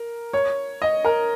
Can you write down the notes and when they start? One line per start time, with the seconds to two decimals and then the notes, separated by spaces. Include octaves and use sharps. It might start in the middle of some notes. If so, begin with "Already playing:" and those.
Already playing: A#4
0.33 C#5
0.82 D#5
1.05 A#4